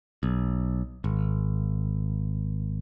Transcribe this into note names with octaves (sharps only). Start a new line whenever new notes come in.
B1
G#1